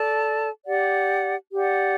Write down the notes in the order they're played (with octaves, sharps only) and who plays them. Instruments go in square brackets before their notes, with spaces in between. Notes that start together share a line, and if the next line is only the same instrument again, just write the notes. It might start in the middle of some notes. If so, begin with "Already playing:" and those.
Already playing: [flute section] A4 D5 A5
G4 D5 F#5
G4 D5 F#5